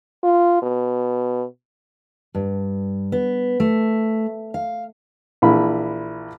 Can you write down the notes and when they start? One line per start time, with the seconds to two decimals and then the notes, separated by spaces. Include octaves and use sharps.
0.23 F4
0.62 B2
2.35 G2
3.12 B3
3.60 A3
4.54 F5
5.42 A#1 E3 B5